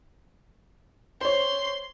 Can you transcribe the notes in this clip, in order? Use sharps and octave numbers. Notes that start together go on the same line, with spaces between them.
C5 C#5 C6